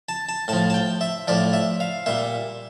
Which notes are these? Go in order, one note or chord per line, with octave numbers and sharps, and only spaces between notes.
A5
A5
A2 F3 A5
A5
G5
E5
A2 F3 D5
E5
F5
A#2 G3 E5